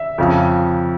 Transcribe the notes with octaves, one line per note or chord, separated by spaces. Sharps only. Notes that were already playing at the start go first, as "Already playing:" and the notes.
Already playing: E5
F2 C#3 F3